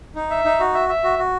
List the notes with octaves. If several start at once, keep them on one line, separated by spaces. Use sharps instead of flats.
D#4
E5
D#4
F#4
E5
E5
F#4
F#4